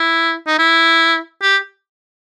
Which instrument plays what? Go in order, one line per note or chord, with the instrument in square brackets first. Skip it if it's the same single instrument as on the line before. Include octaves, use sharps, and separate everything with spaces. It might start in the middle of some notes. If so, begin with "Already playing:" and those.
Already playing: [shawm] E4
D#4
E4
G4